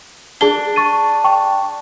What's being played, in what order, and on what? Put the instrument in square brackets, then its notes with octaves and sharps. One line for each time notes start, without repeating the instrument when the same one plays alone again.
[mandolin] D4 [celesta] G#4 A5 G7
[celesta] C#6 A6 D#7
G5 C#6